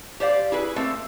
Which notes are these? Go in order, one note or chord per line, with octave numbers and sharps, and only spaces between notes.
G4 C5 D5 F5
E4 G#4 B4
A3 A#3 C4